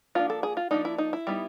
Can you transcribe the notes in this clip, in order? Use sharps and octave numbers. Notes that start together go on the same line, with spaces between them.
F3 A#3 D4 F4
A4
G#4
F4
F3 A#3 D4 D#4
E4
D#4
E4
G3 B3 D#4